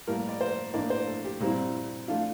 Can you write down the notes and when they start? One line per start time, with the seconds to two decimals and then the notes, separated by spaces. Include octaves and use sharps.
0.07 A2 G3 A#3 A#4
0.29 D5
0.41 C5
0.74 A2 E3 A#3 D4 D5
0.90 C5
1.07 A4
1.24 G4
1.40 A#2 G3 C4 E4
2.08 E3 A3 D4 F4